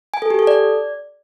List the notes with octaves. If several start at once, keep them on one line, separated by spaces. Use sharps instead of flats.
G#5
A4
G4
A4
D5